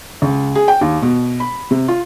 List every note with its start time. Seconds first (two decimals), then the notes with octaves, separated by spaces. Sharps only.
0.22 C#2
0.55 G#4
0.68 G5
0.81 D#2
1.02 B2
1.40 B5
1.71 C3
1.88 F4